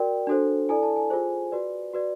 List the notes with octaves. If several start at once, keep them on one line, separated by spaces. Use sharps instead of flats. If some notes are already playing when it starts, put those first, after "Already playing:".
Already playing: F#4 A#4 D5 G5
D4 F#4 A4 C5
E4 A4 D5 G#5
A5
G#5
F4 G#4 C5
F#4 B4 D5
F#4 B4 D5